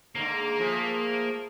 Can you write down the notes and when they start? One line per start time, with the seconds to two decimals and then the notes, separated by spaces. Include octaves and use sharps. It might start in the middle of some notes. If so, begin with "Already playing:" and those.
0.15 G#2 D3 A#3
0.59 F3 A3 G#4